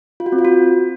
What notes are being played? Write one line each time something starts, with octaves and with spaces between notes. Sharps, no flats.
F4
F#4
C4
F4
F#4